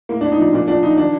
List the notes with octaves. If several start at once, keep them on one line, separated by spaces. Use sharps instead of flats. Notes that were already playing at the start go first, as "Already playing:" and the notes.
A2 A#3
D4
A2
D#4
F3 D4
A#2 D4
A#2 D4
F3 D#4
D#3 D4